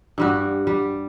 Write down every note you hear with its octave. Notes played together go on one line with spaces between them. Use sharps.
G2 G3 F#4
G3